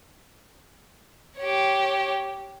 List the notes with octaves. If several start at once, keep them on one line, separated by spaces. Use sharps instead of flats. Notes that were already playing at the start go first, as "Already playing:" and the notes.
G4 C#5